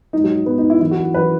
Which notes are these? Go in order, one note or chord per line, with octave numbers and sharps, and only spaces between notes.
F#3 D#4
G#2
F#3
G#2 F#3 B3
D#4
E4
F#2 E3 E4
F#4
F#2 E3 B4